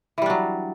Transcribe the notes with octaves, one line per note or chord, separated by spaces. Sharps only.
E3 F#3 G3 D4